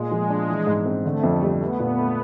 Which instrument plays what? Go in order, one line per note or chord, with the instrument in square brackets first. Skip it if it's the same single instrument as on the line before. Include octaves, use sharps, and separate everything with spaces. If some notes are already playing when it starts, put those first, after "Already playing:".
Already playing: [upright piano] A#2 [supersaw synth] G#3
[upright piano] F3
D4
E3
G#2
C4
[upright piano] D3 [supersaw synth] A3
[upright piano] F2
G3
[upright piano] A3 [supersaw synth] B3
[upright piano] A#2
A3